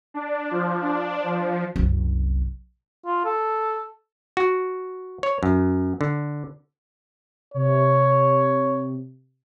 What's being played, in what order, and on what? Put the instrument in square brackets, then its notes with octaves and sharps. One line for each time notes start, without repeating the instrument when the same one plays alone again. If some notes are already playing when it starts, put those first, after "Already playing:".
[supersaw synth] D4
F3
D4
F3
[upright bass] F#1 C2
[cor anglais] F4
A4
[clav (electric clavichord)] F#4
C#5
F#2
D3
[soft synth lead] C3 [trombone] C#5